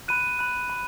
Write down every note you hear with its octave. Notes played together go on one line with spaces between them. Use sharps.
B5 F#6 D#7
B5 F#6
B5